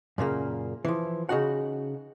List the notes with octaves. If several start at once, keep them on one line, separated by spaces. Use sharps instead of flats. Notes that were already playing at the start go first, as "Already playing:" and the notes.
F#2 A#2 C#3 A#3
E3 F3
C#3 D#4 F#4 F#5